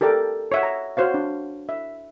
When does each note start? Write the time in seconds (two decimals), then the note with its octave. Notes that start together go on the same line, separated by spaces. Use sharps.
0.01 G4 A4 A#4 D5 G5
0.52 C#5 E5 F#5
0.63 A#5
0.97 F#4 C5 C#5 F5
1.14 D4
1.69 E5